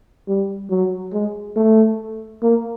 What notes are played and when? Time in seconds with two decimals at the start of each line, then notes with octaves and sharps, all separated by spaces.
0.28 G3
0.70 F#3
1.13 G#3
1.57 A3
2.42 A#3